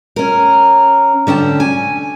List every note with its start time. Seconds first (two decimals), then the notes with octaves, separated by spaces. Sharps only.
0.16 C#4 A#4
1.27 D3 C#4 G5 A5
1.60 G#5